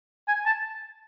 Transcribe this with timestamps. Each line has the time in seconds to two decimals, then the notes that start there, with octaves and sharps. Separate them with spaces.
0.28 G#5
0.46 A5